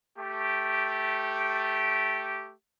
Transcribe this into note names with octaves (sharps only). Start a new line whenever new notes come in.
A3 G4